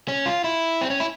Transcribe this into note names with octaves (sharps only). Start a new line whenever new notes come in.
C#4
F4
E4
C4
C#4
E4